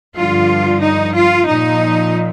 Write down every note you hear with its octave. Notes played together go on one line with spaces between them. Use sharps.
G2 D3 F3 F4
D#4
F4
A#2 F3 D#4